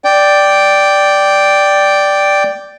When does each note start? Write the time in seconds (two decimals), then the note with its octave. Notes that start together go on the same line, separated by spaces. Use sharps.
0.05 D5 G5